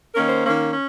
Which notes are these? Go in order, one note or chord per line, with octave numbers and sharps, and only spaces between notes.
D#3 A#3 C#4 A#4
C5
D#3 A#3 C#4
C#4